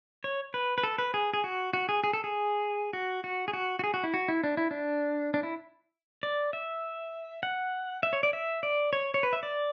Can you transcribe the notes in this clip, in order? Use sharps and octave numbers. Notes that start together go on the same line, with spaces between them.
C#5
B4
B4
A4
B4
G#4
G#4
F#4
F#4
G#4
G#4
A4
G#4
F#4
F#4
G#4
F#4
F#4
G#4
F#4
E4
F#4
E4
D4
E4
D4
D4
E4
D5
E5
F#5
E5
C#5
D5
E5
D5
C#5
C#5
B4
E5
D5